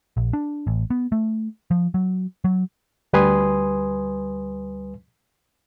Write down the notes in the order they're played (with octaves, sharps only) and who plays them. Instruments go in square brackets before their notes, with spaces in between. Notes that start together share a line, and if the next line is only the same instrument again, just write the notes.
[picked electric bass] A#1
D4
A1
B3
A3
F3
F#3
F#3
[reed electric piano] D2 G3 B4 G#5 C6 D#6